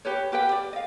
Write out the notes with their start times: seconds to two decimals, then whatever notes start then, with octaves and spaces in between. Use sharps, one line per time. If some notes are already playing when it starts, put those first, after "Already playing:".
0.05 G4 B4 C#5
0.32 F#4 G4 B4 G5
0.49 G4 D5
0.73 D#5 F5